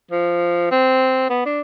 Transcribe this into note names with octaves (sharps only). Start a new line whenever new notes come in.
F3
C4
B3
D4